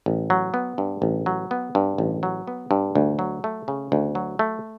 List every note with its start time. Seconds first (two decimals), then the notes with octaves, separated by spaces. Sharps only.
0.06 A1
0.30 F#3
0.54 B3
0.78 G2
1.02 A1
1.26 F#3
1.51 B3
1.75 G2
1.98 A1
2.23 F#3
2.47 B3
2.71 G2
2.95 D2
3.19 F#3
3.44 A3
3.68 C#3
3.92 D2
4.15 F#3
4.39 A3